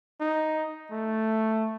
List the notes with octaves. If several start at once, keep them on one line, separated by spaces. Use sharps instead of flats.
D#4
A3